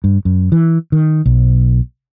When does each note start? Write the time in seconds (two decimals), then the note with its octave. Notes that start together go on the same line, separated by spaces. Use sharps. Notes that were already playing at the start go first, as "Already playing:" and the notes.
0.04 G2
0.25 F#2
0.52 E3
0.92 D#3
1.26 B1